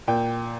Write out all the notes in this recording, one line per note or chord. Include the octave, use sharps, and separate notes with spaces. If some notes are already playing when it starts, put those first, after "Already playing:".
A#2 G5